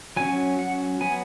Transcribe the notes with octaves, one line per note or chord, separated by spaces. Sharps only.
F#3 C#4 G#5
F#5
F#3 B3 G#5